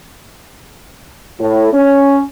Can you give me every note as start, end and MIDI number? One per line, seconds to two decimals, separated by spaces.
1.40 1.71 45
1.73 2.22 61